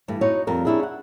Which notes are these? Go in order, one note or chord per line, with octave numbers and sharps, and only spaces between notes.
G2 E3 A3
D#4 E4 F#4 C#5
F2 G3 A#4
C#4 D4 E4 G4 G#4
F#5